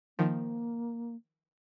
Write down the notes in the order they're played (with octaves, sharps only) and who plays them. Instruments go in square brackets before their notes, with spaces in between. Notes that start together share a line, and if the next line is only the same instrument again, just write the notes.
[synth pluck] D#3 F3 [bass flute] A#3